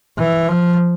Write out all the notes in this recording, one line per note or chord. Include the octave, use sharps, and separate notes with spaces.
E3
F3